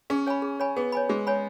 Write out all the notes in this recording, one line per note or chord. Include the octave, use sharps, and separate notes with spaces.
C#4 G#4
C#5 G#5 B5
G#4
C#5 G#5 B5
B3 G#4
C#5 G#5 B5
G#3 G#4
C#5 G#5 B5